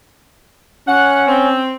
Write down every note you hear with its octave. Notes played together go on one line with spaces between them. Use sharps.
C#4 F#5
C4